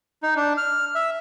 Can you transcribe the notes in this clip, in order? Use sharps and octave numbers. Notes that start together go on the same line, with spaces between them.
D#4
D4
F6
E5